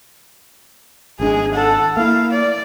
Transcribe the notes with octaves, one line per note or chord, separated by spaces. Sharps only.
G#1 G#3 C#4 D4 G#4
A4 F#5
A#3 E4 F5
D5